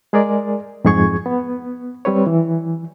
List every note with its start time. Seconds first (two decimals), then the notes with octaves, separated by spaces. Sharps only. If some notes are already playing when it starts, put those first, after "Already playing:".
0.13 G#3 G#4 A#4 D5
0.85 F2 G#2 G#4 C#6 G#6
1.26 B3
2.05 G3 C4 B4 C#5
2.27 E3